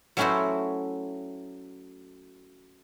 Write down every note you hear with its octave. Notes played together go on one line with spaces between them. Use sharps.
F#3 A3 C#4 E4 F#4 C5